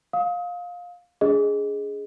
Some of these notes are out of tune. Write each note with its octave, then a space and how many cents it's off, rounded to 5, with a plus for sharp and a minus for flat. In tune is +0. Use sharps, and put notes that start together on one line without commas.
F5 +20 D#6 +35
D4 -35 G#4 +0 D#5 +0